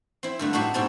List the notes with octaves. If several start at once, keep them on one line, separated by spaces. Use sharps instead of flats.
C4 E4
G2 D3 A3
A2 A3 D#4 F#4 G4 E5
G#2 B2 C4 D#4 G#4 A5